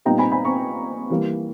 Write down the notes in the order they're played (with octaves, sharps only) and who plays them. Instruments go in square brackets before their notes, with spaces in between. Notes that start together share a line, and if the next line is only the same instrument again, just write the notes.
[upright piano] A#2 G3 B3 D#4 G5 A#5
G#5 B5
G#5 B5
A#5 C#6
E3 G3 A#3